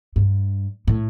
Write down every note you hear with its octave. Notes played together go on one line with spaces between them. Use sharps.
G2
A2